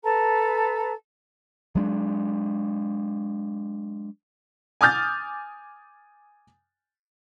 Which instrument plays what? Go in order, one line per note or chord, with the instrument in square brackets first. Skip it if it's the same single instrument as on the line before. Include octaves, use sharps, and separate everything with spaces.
[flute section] A4 B4 A5 A#5
[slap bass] F#3 G#3 D4
[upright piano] G#5 D6 D#6 F6 G6 A6